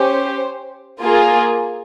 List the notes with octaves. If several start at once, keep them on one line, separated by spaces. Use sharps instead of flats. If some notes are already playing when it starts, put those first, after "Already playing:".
Already playing: C#4 G4 C5
A#3 F4 G#4